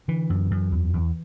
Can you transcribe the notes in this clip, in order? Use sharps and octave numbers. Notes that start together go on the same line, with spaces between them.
D3 E3
F#2
F#2
E2
E2